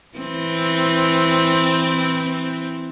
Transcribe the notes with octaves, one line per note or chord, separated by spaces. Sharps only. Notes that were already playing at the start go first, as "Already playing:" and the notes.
E3 C4